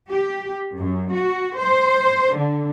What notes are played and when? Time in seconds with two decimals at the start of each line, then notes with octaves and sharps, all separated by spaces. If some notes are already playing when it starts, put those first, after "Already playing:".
0.10 G4
0.75 F#2
1.13 F#4
1.57 C5
2.35 D3